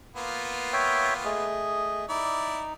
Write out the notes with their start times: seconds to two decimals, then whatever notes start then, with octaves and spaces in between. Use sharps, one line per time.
0.16 A#3 B3 F4
0.73 C#5 E5 G5
1.25 A3 G#4 D#5
2.09 D#4 E4 D5